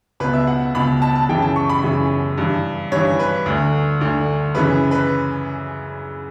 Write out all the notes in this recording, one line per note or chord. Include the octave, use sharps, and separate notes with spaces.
C#2 B2 B4
E5
F#5
C#2 B2 B5
A5
A5
F#2 C#3 E3 G5
A5
C#6
B5
F#2 C#3 E3
G2 E3
G2 E3 C#5
B4
D2 D3
D2 D3
F#2 C#3 E3 B4
B4